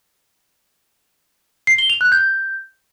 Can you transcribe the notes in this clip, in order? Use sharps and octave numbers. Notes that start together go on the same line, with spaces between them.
C7
G7
F7
F#6
G6